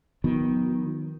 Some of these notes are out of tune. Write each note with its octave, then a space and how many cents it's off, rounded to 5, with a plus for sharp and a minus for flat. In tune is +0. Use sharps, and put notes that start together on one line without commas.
D#3 +5 F#3 -40 B3 +0